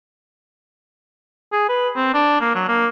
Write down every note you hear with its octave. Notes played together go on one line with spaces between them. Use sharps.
G#4
B4
C4
D4
A#3
F#3
A#3